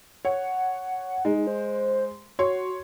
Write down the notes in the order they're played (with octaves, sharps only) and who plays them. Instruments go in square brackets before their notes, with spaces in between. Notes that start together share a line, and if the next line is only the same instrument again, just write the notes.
[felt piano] C#5 [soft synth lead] F#5
[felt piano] G#3 [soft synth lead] D#4
[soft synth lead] C5
[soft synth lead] F#4 [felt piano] C#5 C6